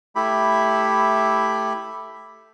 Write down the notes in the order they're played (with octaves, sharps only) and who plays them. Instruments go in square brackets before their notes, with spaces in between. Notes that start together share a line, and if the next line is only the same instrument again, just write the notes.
[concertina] A3 E4 G4 B5